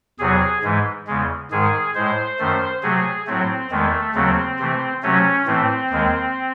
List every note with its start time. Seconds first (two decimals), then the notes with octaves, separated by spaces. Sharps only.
0.19 E2 C3 F#3 G#4
0.63 G#2 E3 G#3
1.07 E2 C#3 G#3
1.51 G#2 D#3 G#3 G#4
1.95 A2 G#3 C5
2.39 F#2 D#3 A3
2.83 C3 F#3 A3 G#4
3.27 A2 F#3 A3 C4
3.71 E2 D#3 G#3 A3
4.14 D#2 C#3 F#3 A3 C4
4.59 C3 E3 A3
5.02 C3 F#3 A3 C#4
5.46 A2 E3 A3 C4
5.91 D#2 D#3 G#3